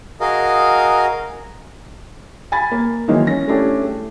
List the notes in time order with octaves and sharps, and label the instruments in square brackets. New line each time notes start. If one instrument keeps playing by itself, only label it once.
[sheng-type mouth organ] F#4 G#4 A#4 D#5 F5
[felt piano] G#5 B5 A6
A#3
D#3 E3 F#3 G#3 A#3 D#4
C#4 A#6
A3 C#4 D4 E4 G4 A4
A3